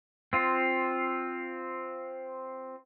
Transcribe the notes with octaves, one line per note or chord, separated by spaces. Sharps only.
C4 F4